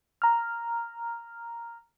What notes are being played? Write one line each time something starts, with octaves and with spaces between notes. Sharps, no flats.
A#5 F6